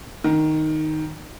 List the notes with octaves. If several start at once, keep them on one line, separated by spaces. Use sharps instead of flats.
D#3